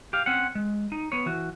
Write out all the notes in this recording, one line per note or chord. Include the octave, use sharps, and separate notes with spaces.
G4 F5
C4 C#4 F#5
G#3
D#4
B3 C#5
E3 F#4